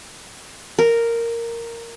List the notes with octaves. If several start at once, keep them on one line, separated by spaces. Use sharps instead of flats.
A#4